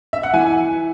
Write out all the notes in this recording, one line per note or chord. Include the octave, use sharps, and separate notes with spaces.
E5
F#5
E3 G#5